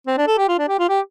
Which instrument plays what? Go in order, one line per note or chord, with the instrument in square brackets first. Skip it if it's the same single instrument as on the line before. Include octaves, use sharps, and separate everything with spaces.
[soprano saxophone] C4
D4
A4
G4
F4
D4
G4
F4
G4